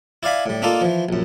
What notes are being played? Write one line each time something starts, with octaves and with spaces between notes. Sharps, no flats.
E4 D5 F5 G#5 B5
A2 G3
A#3 D4 D#4 F4 A4
E3 F3
A#1 F#2